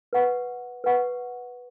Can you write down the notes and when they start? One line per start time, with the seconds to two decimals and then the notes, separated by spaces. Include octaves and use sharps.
0.13 B4 F#5 C#6
0.84 B4 F#5 C#6